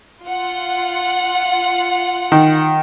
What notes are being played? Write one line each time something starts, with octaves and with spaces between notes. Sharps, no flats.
F4 F#5
D#3